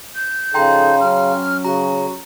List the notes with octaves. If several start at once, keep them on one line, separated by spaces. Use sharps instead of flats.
G6
C#3 F3 D#4 A4 G5 A#5 C6
F#3 C#4 F6
C#3 F#4 A#5